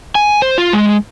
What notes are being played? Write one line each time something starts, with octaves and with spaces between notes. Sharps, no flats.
G#5
C5
F4
G#3